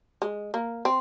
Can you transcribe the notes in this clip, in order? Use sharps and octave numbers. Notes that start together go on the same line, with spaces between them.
G#3
A#3
C4